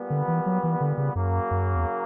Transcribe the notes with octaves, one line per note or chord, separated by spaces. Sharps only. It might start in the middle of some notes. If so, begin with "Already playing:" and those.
Already playing: A#2 G3 B3
D3
E3
F#3
E3
D3
C#3
F#2 C#3 F#3 A#3
F#2
E2